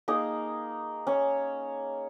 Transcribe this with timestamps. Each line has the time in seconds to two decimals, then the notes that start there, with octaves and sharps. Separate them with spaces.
0.08 A#3 D#4 G#4 D#6
1.07 C#4